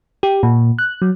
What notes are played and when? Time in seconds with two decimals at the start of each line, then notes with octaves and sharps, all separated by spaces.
0.23 G4
0.43 A#2
0.79 F#6
1.02 F#3